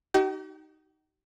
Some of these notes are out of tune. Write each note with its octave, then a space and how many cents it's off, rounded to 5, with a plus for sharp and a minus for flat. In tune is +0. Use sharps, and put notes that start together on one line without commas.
D#4 +0 G4 -45